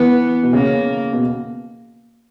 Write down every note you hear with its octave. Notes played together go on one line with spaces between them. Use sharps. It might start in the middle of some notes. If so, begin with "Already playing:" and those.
Already playing: E3 B3
B2
C#3 A#3
B2